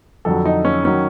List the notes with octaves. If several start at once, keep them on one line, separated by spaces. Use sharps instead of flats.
F2 D3 F#3 A4
D#4
C#4
D#3 F#3 C#4